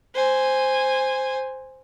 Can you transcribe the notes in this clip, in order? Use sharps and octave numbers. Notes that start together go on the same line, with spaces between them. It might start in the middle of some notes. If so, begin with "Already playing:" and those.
C5 G#5